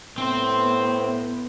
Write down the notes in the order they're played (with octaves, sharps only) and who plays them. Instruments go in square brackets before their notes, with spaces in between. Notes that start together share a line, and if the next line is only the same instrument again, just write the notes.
[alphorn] A2 [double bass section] B3 [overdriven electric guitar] C4 C5